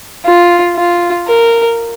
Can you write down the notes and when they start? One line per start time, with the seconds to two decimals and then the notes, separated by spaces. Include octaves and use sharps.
0.26 F4
0.76 F4
1.28 A#4